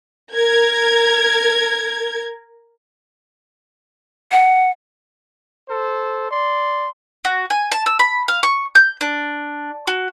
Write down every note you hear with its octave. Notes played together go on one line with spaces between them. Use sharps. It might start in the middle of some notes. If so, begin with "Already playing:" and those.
A#4 G#6
F#5
A4 C5
D5 C6
F#4
G#5
A5
E6
B5
F5
C#6
G6
D4
F#4